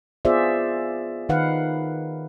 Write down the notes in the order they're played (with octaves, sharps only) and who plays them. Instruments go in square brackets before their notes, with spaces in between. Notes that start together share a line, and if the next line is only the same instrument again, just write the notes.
[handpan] B3 F4 G#4 C5 D5 E5
D#3 D#4 B4 F5 F#5